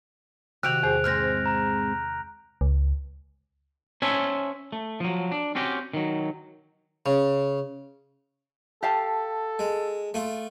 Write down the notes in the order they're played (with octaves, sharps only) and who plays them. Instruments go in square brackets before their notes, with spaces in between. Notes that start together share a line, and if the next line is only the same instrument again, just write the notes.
[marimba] C3 D#3 [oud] F#4 G4 [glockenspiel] F#6 D7 F7
[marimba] E2 G#4 C5
[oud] G#2 G#3 C4 [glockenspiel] F6 G6 A#6
[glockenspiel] A#5
[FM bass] C#2
[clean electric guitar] C#4 C5 C#5 E5 G#5 A5
A3
F3 F#3
D4
C4 C#4 F#4 G4
D#3 F#3
[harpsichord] C#3
[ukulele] G4 F5 A5 [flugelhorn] A4
[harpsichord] G#3
A3 F4